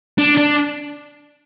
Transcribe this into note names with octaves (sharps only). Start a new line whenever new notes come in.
D4
D4